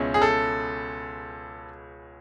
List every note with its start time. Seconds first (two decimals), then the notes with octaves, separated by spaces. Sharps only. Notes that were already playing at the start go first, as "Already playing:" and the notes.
Already playing: C#2 B2 G#3 C#4 E4
0.14 G#4
0.22 A4